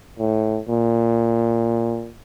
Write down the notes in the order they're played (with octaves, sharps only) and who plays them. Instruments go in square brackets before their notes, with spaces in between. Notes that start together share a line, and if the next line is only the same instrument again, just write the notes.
[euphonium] A2
A#2